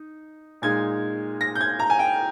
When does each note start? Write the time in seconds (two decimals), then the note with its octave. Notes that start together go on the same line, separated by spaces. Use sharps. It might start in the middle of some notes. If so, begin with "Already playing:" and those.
Already playing: D#4
0.62 A#2 G#3 D#4 G#6
1.41 A#6
1.55 G6
1.61 G#6
1.79 A#5
1.90 G#5
1.99 G5